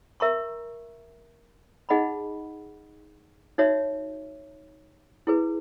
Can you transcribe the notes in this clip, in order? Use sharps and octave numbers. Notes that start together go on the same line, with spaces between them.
A#4 E5 A#5 C#6
D#4 G#4 D#5 F#5 B5
D#4 F#4 C#5 E5
E4 G#4 B4